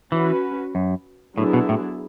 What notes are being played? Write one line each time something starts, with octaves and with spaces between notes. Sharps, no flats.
E3 C#4 F#4 B4
F#2
A2 D3 F#3 B3 E4 G#4
B2
A2